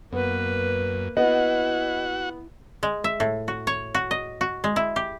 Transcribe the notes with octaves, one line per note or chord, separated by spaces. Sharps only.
F#2 A#3 B3 B4
B3 E4 F#4 D#5 F#5
G#3
E5
A2
F#4
C#5
F#4
D#5
F#4
G#3
E4
G4